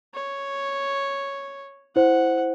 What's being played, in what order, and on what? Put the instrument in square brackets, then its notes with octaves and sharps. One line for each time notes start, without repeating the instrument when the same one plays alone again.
[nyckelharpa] C#5
[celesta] E4 C5 [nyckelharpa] F#5